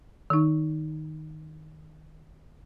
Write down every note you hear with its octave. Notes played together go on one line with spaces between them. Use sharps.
D#3 D#4